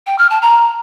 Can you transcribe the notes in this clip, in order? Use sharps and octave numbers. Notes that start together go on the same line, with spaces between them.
G5
F6
A5
A#5